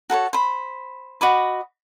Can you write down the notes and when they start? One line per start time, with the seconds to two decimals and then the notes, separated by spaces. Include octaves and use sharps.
0.10 F#4 A4 B4 C#5
0.33 C5 B5
1.21 F#4 D#5 B5 D6